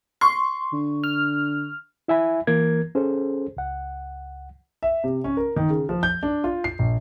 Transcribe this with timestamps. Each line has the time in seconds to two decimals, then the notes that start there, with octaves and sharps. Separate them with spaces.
0.21 C6 C#6
0.73 D3
1.04 F6
2.08 E4 E5 G#5 B5
2.47 E3 A#3 A#4 G#6
2.95 C#4 G#4 A4 C5
3.57 C#2 F#5
4.83 E5
5.04 C3
5.24 C#4
5.37 A#4
5.56 D#3
5.70 C#3
5.89 F3
6.03 G6
6.23 D4
6.44 F4
6.64 C7
6.79 A#1